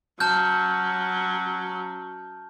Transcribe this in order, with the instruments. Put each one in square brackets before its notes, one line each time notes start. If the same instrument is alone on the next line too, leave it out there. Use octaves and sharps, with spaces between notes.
[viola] F#3 C#4 [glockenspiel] A5 F6 G6